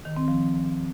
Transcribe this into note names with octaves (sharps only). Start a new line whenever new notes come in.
D#3
C4
F3